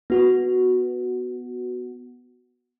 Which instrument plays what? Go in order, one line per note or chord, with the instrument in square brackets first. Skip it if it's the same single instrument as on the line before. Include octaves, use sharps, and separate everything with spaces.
[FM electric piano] B3 F#4